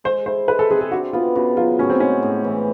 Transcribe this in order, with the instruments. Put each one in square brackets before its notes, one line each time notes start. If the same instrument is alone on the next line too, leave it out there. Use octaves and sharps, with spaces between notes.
[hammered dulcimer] G#3 [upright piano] C5
[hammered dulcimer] E4 [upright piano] C5
[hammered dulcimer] G#3 [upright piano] B4
[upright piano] A4
[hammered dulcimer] C4 [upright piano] G#4
[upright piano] G#4
[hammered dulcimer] D4 [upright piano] F#4
[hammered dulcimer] B3 [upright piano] F4
[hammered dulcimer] C#3 [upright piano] F#4
[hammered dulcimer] F#3 [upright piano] F4
[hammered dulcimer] A2 [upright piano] C#4
[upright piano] C4
[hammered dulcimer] G#3 [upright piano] C#4
[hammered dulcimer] A2
E3